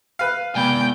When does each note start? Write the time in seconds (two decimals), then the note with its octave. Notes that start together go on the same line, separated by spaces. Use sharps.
0.19 B4 F5
0.55 C3 G#3 B3 D5 G5 G#5 B5